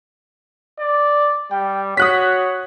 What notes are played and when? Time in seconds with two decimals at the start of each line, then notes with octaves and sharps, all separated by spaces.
0.80 D5
1.52 G3 G5
1.97 F#4 C#5 D#6 F#6 B6